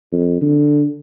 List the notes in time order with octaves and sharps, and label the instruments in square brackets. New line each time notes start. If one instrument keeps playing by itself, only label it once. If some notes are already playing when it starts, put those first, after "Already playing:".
[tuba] F2
D3